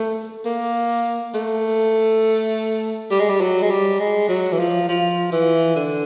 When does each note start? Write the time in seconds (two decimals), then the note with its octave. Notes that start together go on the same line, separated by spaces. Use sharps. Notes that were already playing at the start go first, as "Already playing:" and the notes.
Already playing: A3
0.45 A#3
1.35 A3
3.11 G3
3.19 G#3
3.29 G3
3.41 F#3
3.63 G#3
3.70 G3
4.00 G#3
4.29 F#3
4.52 E3
4.59 F3
4.89 F3
5.32 E3
5.76 D3